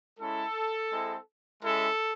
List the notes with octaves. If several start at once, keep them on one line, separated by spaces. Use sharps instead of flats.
G#3 C#4 E4 A4
G#3 C4 E4
G#3 C#4 E4 A4